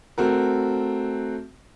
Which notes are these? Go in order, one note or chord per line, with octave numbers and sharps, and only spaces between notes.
A3 C4 F#4 A#4